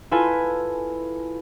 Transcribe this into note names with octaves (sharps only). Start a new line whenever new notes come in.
E4 F4 A4 B4 G#5